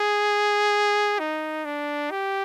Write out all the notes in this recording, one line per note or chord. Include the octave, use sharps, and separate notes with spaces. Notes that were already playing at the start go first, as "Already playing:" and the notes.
Already playing: G#4
D#4
D4
G4